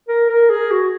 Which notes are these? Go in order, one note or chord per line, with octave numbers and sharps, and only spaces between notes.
A#4
A#4
G#4
F#4